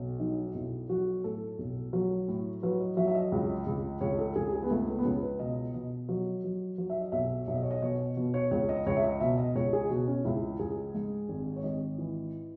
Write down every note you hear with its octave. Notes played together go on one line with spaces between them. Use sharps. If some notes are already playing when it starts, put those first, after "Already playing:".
Already playing: B1
F#3 D#4
D#4
B1 E4
F#3 F#4
A2 A4
B1
F#3
A2
F#3 B4
D#5
F#3 E5
E5
D#5
C#2
C#2
C#2 C#5
A4
C#2 G#4
G#4
B3
C#2 A3
B3
B3
C#2 C#4
B4
B2 D#5
B2 D#5
F#3
F#3
F#3
E5
D#5
B1 E5
B1 E5
D#5
C#5
D#5
B2 C#5
B2
C#5
C#2 C#5
D#5
C#2 C#5
E5
D#5
B2 E5
D#5
C#2 C#5
G#4
B2 F#4
C#4
C#2 E4
C#2 G#4
G#2
G#1
C#5
G#1 D#5
E3